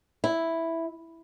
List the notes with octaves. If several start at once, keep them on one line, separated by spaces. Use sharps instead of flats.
E4